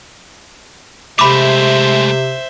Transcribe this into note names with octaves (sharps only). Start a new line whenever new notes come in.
C3 G#3 A3 C5 E5 B5 D6